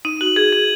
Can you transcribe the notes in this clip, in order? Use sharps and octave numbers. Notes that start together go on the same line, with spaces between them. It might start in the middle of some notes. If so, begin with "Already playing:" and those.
D#4 D#7
F#4 F#7
G#4 G#6
G#4 F#7